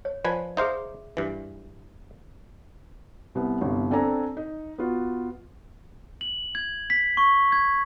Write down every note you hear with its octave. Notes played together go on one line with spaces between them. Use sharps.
C#5
F3 B4 D5 G#5
D#4 G#4 C5 E5 F5
G2 E3
C2 B3
G1 C2
C4 D4 A4 D5 G#5 A#5
D#4
B3 F4 F#4
F#7
G#6
B6
C#6
G#6